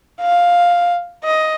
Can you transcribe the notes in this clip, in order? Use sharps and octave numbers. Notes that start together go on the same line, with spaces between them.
F5
D#5